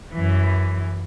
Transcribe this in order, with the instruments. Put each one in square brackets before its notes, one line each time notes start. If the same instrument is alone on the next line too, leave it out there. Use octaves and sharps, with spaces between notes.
[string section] F#2 E3